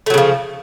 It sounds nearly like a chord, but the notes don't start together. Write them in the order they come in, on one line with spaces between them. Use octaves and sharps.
A3 F#3 C#3 F3